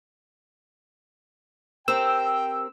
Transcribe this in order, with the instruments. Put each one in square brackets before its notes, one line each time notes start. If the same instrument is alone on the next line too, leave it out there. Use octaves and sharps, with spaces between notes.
[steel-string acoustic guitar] C4 G4 A#4 [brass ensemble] G5 [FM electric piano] E6